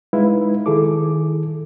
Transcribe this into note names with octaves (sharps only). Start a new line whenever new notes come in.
G#3 D#4 E4 B4 F5
D#3 E4 G#4 A4 D6